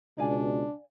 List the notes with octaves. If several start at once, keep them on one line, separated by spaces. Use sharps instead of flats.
C#2 B2 D4 D5 F5 G#5